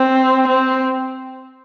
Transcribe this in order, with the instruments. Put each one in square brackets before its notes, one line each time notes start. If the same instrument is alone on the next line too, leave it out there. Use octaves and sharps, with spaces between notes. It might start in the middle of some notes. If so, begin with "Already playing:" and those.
Already playing: [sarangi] C4
C4